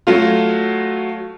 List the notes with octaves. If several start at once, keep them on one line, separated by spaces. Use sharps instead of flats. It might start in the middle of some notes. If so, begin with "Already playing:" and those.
F#3 A3 F4